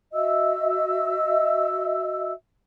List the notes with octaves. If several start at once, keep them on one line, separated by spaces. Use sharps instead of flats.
F#4 D#5 E5 E6